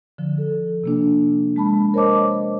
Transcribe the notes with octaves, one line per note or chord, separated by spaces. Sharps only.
D3 F3
A4
C3 A#3 D4
G#3 A5 B5
A#4 C5 C#5 D#5 A5 D6